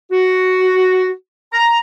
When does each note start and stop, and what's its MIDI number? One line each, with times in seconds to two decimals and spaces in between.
0.12 1.11 66
1.53 1.79 82